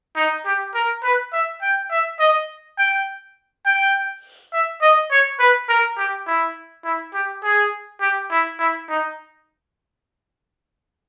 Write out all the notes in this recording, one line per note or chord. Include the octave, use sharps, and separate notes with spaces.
D#4
G4
A#4
B4
E5
G5
E5
D#5
G5
G5
E5
D#5
C#5
B4
A#4
G4
E4
E4
G4
G#4
G4
E4
E4
D#4